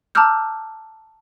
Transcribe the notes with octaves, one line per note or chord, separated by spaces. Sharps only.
A5 A#5 D6 E6 F6 G6